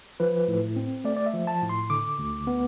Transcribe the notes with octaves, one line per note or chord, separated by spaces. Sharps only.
F3 B4
A2
C4
A3 D5
D5
E5
F3
A5
A2
C6
D3 D6
D2
B3